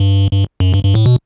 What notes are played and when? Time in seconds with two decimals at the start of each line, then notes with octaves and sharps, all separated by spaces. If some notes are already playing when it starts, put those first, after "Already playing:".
Already playing: G2
0.32 G2
0.60 F#2
0.74 G2
0.84 G2
0.95 A2
1.06 B2